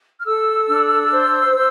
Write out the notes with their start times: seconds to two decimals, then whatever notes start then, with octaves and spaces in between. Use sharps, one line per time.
0.19 F6
0.26 A4 E6
0.69 D4
1.12 C5
1.54 C5